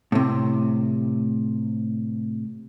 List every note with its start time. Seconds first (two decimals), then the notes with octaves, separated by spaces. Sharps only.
0.12 A2 C3